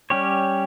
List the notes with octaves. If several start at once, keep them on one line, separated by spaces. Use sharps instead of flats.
G3 C#4 G4 C#5